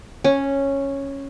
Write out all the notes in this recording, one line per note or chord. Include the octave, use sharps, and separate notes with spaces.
C#4